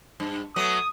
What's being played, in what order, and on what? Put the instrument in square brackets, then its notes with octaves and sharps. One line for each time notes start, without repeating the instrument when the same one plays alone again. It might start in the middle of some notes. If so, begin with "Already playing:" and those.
[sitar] G2
[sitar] F#3 A3 B3 [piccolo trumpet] D#6